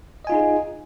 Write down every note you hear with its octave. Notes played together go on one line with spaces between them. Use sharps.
D#4 F4 G#4 D#5 G#5